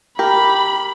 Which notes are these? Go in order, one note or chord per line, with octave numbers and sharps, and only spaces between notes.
G4 A#4 B5